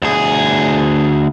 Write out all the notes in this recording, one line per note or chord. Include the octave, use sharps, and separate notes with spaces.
D2 G#4